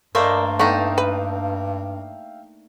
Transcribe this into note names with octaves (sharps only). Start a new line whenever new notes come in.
G2 A3 A#3 A#4 C5 D5 D#5
A3 B3 D4 D#4 E5 F5 G5
B4